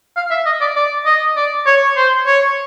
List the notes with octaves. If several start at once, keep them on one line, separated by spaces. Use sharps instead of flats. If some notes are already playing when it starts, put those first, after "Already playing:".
F5
E5
D#5
D5
D5
D#5
D5
C#5
C5
C#5